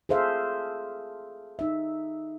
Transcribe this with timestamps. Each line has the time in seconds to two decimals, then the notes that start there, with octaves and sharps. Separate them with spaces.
0.09 G#4 A4 C5 E5 F5
1.59 D#4 E5